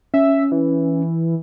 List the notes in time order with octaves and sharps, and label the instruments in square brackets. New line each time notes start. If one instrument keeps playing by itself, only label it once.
[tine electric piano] C#4 [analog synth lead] E5
[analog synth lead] E3